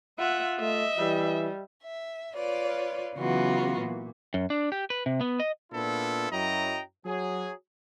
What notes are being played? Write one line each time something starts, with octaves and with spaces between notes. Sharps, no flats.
F4 E5 F#5
A3 D#5 E5
E3 G3
E5
F4 B4 C#5 D5
C#3 E3 F#3 B3 F4 F#4
A#2
F#2
D4
G4
B4
C3
B3
D#5
A#2 B3 D4 E4 F4 A4
F#2 F#3 E4 D#5 G5 A#5
F#3 G#4